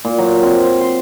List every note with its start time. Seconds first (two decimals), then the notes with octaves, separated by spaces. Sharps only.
0.05 A#2
0.18 F#3
0.43 C4
0.65 C5
0.81 C6